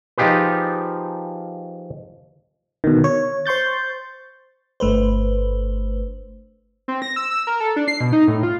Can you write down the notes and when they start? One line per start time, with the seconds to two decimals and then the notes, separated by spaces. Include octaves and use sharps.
0.18 F3 D#4 F4 G4 G#4 B4
2.84 B2 D3 D#3
3.04 C#5
3.46 C5 C6 C#6 G6 A6
4.80 G1 A3 B4 C5
6.88 C4
7.02 A#6
7.16 E6
7.31 E6
7.47 A#4
7.60 A4
7.76 D4
7.88 C7
8.00 B2
8.13 D#4
8.28 A2
8.43 F4